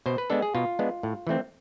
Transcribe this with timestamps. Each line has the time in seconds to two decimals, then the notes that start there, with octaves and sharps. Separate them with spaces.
0.06 B2 C5
0.18 B4
0.30 G#3 B3 D4 A4
0.42 G#4
0.54 B2 F4
0.79 G#3 B3 D4
1.03 A2
1.27 E3 A3 C4